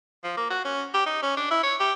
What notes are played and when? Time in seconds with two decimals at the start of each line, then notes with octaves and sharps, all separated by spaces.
0.24 F3
0.37 A#3
0.50 F#4
0.65 C#4
0.94 G4
1.06 D#4
1.23 C#4
1.37 D4
1.51 E4
1.63 C#5
1.80 G4